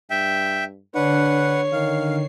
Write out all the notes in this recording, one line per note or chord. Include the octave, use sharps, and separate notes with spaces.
G2 E5 G5
D3 D4 B4 C#5 F#5 C7
D#3 F5